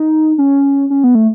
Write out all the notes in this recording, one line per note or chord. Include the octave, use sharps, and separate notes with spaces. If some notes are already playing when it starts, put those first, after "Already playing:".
Already playing: D#4
C#4
C#4
B3
A3